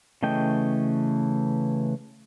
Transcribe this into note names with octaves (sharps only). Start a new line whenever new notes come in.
C#3 E3 A3 D#5 G5